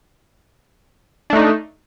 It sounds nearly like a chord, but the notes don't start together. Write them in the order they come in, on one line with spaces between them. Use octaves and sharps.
D4 A3 D#4